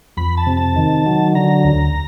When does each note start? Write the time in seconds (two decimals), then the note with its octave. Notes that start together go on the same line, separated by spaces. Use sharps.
0.17 F2 B5
0.37 A5
0.47 C3
0.57 A5
0.76 D#3
1.06 F#3
1.35 D3 A#5
1.64 D2